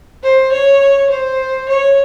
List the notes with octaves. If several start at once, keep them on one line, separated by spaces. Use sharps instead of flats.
C5
C#5
C5
C#5